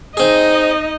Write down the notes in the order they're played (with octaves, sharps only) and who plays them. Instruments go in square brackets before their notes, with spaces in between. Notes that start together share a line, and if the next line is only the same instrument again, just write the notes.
[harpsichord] C4 G#4 [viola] D#4 D#5